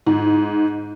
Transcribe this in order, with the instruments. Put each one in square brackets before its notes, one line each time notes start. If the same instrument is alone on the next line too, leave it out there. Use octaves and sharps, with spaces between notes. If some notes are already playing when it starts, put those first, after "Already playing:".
[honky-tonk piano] G#2